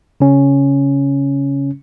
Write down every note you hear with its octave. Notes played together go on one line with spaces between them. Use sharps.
C#3 C#4